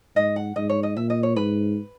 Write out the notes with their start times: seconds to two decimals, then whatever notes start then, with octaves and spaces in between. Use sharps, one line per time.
0.16 G#2 D#5
0.36 F#5
0.56 G#2 D#5
0.69 C#5
0.83 D#5
0.96 A#2 E5
1.10 D#5
1.23 C#5
1.36 G#2 B4